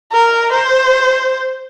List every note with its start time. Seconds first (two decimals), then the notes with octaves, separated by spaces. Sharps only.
0.12 A#4
0.52 C5